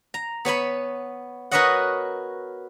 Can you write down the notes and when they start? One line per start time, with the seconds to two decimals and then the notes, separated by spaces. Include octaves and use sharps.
0.14 A#5
0.45 B3 C#5 G#5 B5
1.51 F#4 A#4 B4 C#5 D#5 F#5